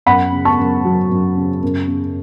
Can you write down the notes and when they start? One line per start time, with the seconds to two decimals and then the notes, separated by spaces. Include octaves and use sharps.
0.06 F#2 F#5 B5
0.32 C#3
0.45 A5 C#6
0.59 F#2
0.85 F#3
1.11 F#2
1.37 C#3
1.63 F#2
1.88 C#3